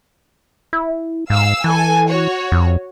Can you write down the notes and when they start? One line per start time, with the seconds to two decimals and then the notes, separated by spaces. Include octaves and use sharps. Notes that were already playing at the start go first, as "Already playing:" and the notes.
0.73 E4
1.30 G#2 F5 E6
1.64 E3 A4 G#5
2.09 F#4 C#5
2.52 F2